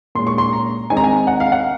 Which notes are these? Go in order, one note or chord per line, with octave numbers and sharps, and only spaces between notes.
A#2 G#3 C#4 C6
C#6
C6
A#5
D#3 G#3 C4 D#4 G#5
A#5
G#5
F#5
F5
F#5